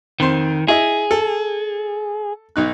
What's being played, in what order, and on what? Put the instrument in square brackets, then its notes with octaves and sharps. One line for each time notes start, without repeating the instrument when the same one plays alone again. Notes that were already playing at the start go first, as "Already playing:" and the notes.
[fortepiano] F2 C5 C6 [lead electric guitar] D#3
[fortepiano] E4 D#5 E5 [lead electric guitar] G#4
[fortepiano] A4
B1 D#4 F#6